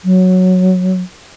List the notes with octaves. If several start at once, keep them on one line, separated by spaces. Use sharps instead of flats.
F#3